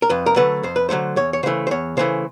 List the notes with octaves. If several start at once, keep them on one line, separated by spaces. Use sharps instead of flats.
A#4
F2 B4
A#4
D3 F#3 A3 B4
F2 C5
B4
D3 F#3 A3 C5
E2 C#5
C#5
C#3 E3 A3 C5
C5
E2 C#5
C#3 E3 A3 C5